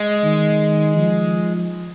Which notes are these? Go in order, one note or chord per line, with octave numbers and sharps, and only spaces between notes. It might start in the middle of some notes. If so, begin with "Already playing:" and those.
Already playing: G#3
D#3
F3